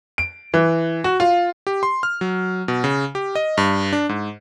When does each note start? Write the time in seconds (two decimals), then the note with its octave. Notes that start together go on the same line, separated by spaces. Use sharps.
0.18 D7
0.54 E3
1.04 F#4
1.20 F4
1.67 G4
1.83 C6
2.03 F6
2.21 F#3
2.68 B2
2.84 C#3
3.15 G4
3.35 D#5
3.57 G2
3.93 D4
4.09 G#2